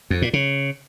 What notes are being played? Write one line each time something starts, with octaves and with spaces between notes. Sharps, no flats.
F2
A#2
C#3